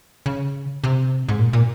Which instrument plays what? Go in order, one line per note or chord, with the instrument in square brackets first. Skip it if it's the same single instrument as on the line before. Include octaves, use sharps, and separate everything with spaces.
[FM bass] C#3
C3
G#2
A#2
A#2